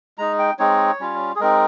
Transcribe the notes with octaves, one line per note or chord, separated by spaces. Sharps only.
G#3 D#4 A#5
G5
G#3 C4 D#4 C#5
G3 C#4 F4
G#4
G#3 C4 D#4 A#4